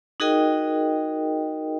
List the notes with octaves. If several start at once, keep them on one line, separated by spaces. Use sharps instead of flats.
D#4 F#4 G#4 A#4 D#5 G5